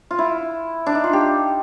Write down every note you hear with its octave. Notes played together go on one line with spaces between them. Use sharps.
F4
E4
D4
D#4
F4
G4